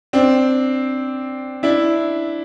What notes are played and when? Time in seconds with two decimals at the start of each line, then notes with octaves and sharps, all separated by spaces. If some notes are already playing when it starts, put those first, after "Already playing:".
0.13 C4 D4
1.63 D4 E4